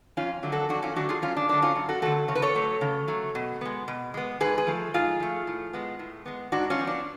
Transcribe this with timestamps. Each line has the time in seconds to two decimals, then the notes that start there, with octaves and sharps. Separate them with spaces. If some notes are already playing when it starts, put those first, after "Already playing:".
0.17 F2 C#4 F4
0.43 D3 F#3 A3
0.52 F#4 A4
0.69 F2 D4 F#4
0.82 C#4 F4
0.96 D3 F#3 A3 D4 F#4
1.09 F4 G#4
1.22 F#2 C#4 F4
1.37 D4
1.49 D3 F#3 A3 D4
1.62 C#4 F4
1.76 F#2
1.89 F#4 A4
2.02 D3 F#3 A3 F#4 A4
2.28 C#3 C#5
2.35 B4
2.42 A4 C#5
2.55 F#3 A3
2.81 C#3
3.08 F#3 A3
3.35 B2
3.61 G#3 B3
3.88 B2
4.14 G#3 B3
4.40 G#2 G#4 B4
4.58 G#4 B4
4.67 F3 A3
4.94 G#2 F4 G#4
5.20 F3 A3
5.47 A2
5.73 G#3 B3
5.99 A2
6.26 G#3 B3
6.52 G#2 D4 F#4
6.70 C#4 F4
6.79 F3 B3
6.87 D4